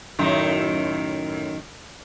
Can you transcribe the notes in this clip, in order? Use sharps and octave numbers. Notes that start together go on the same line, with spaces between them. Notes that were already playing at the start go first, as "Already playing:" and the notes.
F#2 A2 D#3